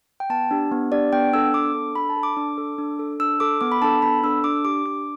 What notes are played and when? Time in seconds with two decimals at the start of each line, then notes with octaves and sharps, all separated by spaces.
0.20 G5
0.30 B3 A5
0.51 D4 G4
0.72 B3
0.92 D4 G4 D5
1.13 B3 G5
1.33 D4 A4 E6
1.54 B3 D6
1.75 D4 A4
1.96 D4 B5
2.10 A5
2.17 A4
2.23 D6
2.37 D4
2.58 A4
2.78 D4
2.99 A4
3.20 D4 E6
3.40 A4 D6
3.61 B3 D6
3.72 B5
3.82 D4 A4 A5
4.02 B3 B5
4.23 D4 A4 E6
4.44 D4 D6
4.65 G4 D6
4.85 D4 D6